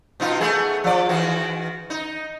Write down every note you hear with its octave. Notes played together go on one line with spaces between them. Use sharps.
B2 D#4 F4
A3 B3 G#4
F3 D5
D#3 E3 F#4
D#4